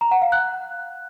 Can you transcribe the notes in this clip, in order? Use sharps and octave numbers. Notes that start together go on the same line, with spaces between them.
A#5
F#5
F5
F#6